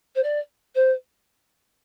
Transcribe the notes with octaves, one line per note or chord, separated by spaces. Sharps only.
C5
D5
C5